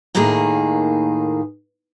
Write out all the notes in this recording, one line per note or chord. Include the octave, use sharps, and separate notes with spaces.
D#2 A2 D#3 A#3 G#4